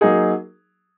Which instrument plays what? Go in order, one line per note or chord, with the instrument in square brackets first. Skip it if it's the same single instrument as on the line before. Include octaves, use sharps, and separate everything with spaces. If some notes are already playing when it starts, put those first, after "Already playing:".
[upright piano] F#3 A#3 D#4 G#4